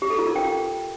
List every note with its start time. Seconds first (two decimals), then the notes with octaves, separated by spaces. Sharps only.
0.02 G4
0.10 A4
0.19 F4
0.27 A#4
0.36 G5